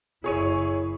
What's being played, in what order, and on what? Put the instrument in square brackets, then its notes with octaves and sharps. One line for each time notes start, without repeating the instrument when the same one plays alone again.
[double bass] F#1 E4 [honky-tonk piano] G#4 C#5 D#7